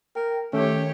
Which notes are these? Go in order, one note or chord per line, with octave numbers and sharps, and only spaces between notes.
A#4 G5
D#3 A3 C#4 G4 C#5